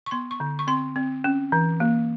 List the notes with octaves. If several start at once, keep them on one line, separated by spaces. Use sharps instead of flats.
C#6
B3 C6
C#6
D3
C#6
C4 C6
C4
C#4
E3
A#3